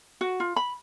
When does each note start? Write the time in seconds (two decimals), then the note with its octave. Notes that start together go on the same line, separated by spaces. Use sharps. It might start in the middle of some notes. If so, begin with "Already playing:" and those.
0.21 F#4
0.40 F4
0.56 B5